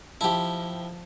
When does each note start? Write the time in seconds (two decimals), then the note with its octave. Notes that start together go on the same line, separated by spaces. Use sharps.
0.21 F3 E4 G4 A5